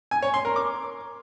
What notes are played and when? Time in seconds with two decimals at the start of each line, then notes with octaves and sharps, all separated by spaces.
0.11 G#5
0.23 C#5
0.34 C6
0.45 A#4
0.56 D6